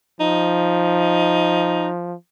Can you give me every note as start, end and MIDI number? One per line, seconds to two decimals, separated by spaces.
0.20 2.15 53
0.20 1.89 63